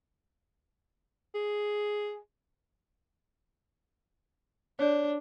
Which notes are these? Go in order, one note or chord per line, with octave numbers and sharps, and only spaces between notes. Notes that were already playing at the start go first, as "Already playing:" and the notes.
G#4
D4 C#5 D5